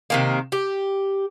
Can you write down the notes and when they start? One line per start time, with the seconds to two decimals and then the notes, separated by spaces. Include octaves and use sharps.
0.10 C3 D#3 A#3
0.52 G4